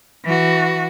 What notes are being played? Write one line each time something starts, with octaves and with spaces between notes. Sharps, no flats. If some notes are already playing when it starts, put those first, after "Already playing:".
E3 F#4